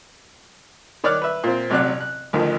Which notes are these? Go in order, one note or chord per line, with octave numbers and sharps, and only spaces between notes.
D#3 C#5 D5 D6 F6 F#6
B4 E5
A#2 C4
A1 C3 F#3 D5 F#6
F#6
A1 D2 D#3 F3